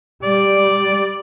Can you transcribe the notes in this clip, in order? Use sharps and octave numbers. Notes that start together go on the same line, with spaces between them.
G3 D5